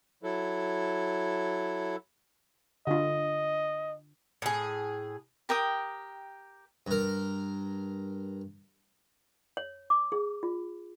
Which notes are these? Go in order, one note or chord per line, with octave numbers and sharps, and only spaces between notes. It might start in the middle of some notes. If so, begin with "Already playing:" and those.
F#3 E4 A4
D3 F4 D#5
A2 G#4
G4 A#4 G5 D#6
G2 A#4
C#5
D6
G#4
F4